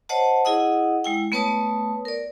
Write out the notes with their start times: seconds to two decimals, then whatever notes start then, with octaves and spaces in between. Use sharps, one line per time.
0.09 C5 C#5 D#5 F#5 A5
0.45 E4 G#4 D#5 F#5 D#6
1.04 G#3 E4 G5
1.32 A3 B3 B4 C#5 A5 D#6
2.05 A#4 D5